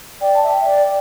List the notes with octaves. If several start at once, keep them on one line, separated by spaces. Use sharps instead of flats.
D5 G5
A5
E5 G5
D5